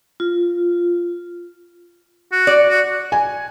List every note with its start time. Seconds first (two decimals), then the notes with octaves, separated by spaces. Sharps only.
0.20 F4
2.32 F#4
2.47 D5
2.69 F#4
3.12 G#5